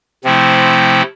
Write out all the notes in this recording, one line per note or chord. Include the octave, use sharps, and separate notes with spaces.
C3 F3 A3 C4 E4